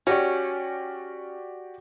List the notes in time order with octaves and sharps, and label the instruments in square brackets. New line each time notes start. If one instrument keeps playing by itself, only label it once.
[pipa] C#4 [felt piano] F#4 G4 D5